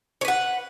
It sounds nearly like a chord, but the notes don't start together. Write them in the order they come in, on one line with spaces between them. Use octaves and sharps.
C#5 B4 F#5